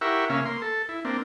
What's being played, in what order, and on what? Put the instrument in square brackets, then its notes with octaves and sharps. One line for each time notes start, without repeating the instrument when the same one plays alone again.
[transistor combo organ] E4 G4 A#4 E5 F#5 C#6
C#3 A#3 C#4 E5 F5
A#3 C6
A4
E4
A#3 C4 D4